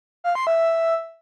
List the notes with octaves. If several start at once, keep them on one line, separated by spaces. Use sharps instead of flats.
F5
C6
E5